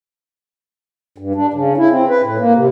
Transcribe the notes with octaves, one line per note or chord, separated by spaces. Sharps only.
G2
D4
C#3
E4
C4
B4
A2
A#3
C3